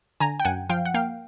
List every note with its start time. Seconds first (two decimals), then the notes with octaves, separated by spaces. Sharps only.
0.20 D3 G#5 A#5
0.40 G5
0.45 F#2 F#5 G#5
0.70 F3 F5 G5
0.85 F#5
0.94 A#3 F5 G5